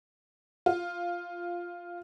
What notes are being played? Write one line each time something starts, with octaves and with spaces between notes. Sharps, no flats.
F4